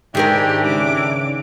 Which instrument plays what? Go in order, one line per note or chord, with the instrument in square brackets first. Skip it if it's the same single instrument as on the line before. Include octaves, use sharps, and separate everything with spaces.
[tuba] G#2 [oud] D#3 G#4 A#4 [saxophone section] E3 D4 [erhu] G4
[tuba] C#3 [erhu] D6